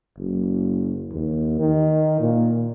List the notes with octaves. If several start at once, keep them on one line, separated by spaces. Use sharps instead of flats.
F#1
D#2
D#3
A#2